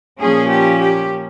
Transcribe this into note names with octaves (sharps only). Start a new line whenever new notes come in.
A#2 F3 A#3 C#4 G#4
G4
G4